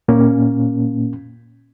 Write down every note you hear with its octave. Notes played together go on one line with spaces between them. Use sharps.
A#2 A#3 C#4